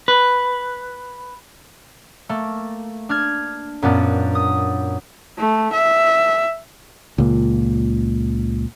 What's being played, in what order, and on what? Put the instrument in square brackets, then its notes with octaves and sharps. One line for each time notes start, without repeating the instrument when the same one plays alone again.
[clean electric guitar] B4
[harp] A3 A#3
D4 F6 G#6
F#2 A#2 B3 D4
D#6
[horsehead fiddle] A3
E5
[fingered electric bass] C#2 A#2